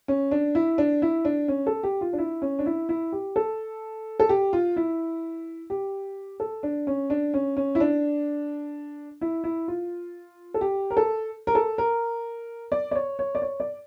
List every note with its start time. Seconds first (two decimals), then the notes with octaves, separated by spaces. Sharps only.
0.08 C#4
0.31 D4
0.55 E4
0.78 D4
1.02 E4
1.25 D4
1.48 C#4
1.67 A4
1.83 G4
2.01 F4
2.13 D4
2.18 E4
2.42 C#4
2.59 D4
2.66 E4
2.89 E4
3.12 G4
3.36 A4
4.20 A4
4.29 G4
4.53 F4
4.76 E4
5.70 G4
6.40 A4
6.63 D4
6.87 C#4
7.10 D4
7.34 C#4
7.57 C#4
7.75 E4
7.80 D4
9.21 E4
9.44 E4
9.68 F4
10.54 A4
10.61 G4
10.90 A#4
10.97 A4
11.47 A#4
11.55 A4
11.78 A#4
12.72 D5
12.91 D5
12.95 C#5
13.19 C#5
13.35 D5
13.42 C#5
13.60 D5